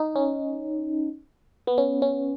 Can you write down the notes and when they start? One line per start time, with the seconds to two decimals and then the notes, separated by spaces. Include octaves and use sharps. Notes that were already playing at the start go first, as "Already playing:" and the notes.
Already playing: D#4
0.16 C#4
1.67 B3
1.78 C#4
2.02 C#4